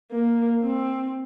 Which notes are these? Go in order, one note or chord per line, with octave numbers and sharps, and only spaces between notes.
A#3
C4